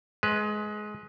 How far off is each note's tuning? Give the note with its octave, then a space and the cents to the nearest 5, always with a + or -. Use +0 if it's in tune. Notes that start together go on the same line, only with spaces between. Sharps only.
G#3 +20 B4 +0